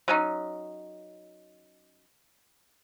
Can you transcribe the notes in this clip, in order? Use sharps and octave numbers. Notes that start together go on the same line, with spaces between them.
F#3 C#4 D#4